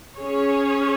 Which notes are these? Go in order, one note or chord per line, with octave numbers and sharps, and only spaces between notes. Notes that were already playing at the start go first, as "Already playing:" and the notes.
C#4 G#4 C#5